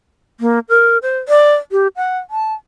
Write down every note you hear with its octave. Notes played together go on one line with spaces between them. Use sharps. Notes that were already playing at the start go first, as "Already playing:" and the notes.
A#3
A#4
C5
D5
G4
F#5
A5